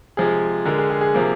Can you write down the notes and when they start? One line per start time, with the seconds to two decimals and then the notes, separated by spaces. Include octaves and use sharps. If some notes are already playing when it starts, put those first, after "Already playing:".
0.17 C3 F3 G#3 G#4
0.65 D3 G#3 A#4
0.78 G#4
0.90 G#4
1.01 G#4
1.14 C3 F3 A#3